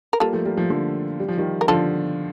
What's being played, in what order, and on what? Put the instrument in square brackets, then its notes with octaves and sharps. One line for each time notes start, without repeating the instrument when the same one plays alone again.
[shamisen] A#4
[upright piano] G3 A#3 [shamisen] F4 A4
[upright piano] F3 A3
G3 A#3
F3 A3
D3 F3
G3
F3
D#3 G3
[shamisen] A#4
[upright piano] D3 F3 [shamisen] F4 A4